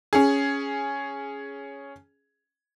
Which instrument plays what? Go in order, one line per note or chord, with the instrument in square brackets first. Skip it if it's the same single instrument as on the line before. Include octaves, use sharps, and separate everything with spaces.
[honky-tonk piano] C#4 G#4